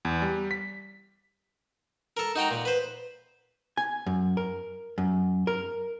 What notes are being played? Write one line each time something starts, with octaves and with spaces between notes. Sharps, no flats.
E2
G3
B6
A4 A#4
D#4 F#4 G5 A#5
A#2
B4 C5
G#5
F#2
A#4
F#2
A#4